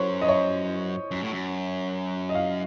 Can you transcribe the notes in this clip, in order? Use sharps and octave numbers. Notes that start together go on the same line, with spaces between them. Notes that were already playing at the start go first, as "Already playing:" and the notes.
Already playing: F#2 C5 C#5
D#5
C#5
F#2
A2
F#2
D#5
F5